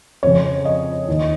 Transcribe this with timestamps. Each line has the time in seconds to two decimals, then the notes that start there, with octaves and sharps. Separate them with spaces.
0.23 F2 C#3 C#5
0.65 D#5
1.08 D#2 D#3